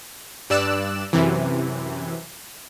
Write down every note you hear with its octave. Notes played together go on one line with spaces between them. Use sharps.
G2 D5 E6 F#6 E7
F#2 C3 E3